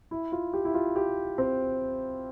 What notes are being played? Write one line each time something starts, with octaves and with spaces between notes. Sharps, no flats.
E4
F4
G4
E4
F4
G4
C4